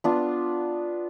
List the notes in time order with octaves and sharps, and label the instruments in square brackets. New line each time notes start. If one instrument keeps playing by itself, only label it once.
[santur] B3 D4 F4